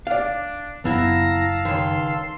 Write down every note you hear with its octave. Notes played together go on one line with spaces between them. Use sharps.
D4 D5 F5
F#1 B3 E4 F5 A5 A#5 E6
C#2 D#3 C6